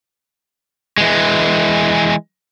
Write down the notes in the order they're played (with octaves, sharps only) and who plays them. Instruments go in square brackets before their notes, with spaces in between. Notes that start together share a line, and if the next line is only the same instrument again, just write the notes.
[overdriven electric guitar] E3 G#3